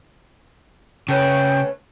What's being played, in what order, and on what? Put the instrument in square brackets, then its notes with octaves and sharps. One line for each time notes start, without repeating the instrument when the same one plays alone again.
[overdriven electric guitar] C#3 [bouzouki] A3 C#4 B4 [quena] G5